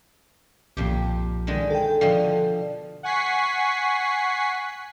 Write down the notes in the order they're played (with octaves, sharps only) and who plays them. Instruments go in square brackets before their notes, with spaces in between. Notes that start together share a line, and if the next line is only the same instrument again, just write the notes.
[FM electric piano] B1 A#2 [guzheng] F2 G4
[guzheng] D3 D#3 G#3
[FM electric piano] A4 G5
[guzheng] B2 D3 F3
[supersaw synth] F#5 G#5 C#6 B6 C7